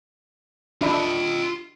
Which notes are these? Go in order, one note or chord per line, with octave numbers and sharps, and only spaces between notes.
D4 F4 D#5 E5 B5